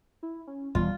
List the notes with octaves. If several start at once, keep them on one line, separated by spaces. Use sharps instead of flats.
E4
C#4
D#1 E3 G3 B3 F4